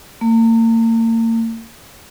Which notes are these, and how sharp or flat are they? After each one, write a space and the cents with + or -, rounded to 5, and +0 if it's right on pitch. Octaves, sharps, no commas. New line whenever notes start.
A#3 -40